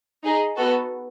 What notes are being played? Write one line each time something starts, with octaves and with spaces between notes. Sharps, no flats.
D#4 G#4
B3 F#4 A4